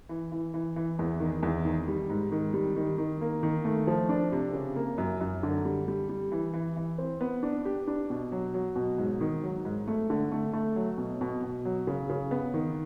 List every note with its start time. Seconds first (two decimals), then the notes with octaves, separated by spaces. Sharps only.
0.09 E3
0.32 E3
0.54 E3
0.76 E3
0.99 E2
1.20 D#3
1.43 E2
1.65 D#3
1.88 G3
2.10 G#2
2.32 D#3
2.54 G3
2.76 D#3
2.98 D#3
3.21 A#3
3.43 D#3
3.65 A3
3.87 F3
4.09 D4
4.32 C3
4.53 C#3
4.76 A#3
4.98 F#2
5.21 F#2
5.43 D3
5.65 G3
5.88 G3
6.09 G3
6.32 E3
6.53 E3
6.77 E3
6.98 C4
7.21 B3
7.43 D4
7.65 G4
7.87 D4
8.10 B2
8.32 F#3
8.54 F#3
8.76 B2
8.98 G#2
9.21 D#3
9.43 F#3
9.65 G#2
9.87 A3
10.10 D3
10.32 A3
10.53 A3
10.76 F#3
10.98 B2
11.21 B2
11.43 B2
11.65 F#3
11.87 C#3
12.09 C#3
12.31 B3
12.54 D#3